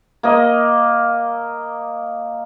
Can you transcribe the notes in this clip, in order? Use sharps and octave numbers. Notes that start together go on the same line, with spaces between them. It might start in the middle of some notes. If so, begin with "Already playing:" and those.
A#3 D#5